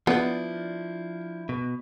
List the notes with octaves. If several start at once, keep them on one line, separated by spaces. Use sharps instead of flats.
F3 B3 D4 E4
B2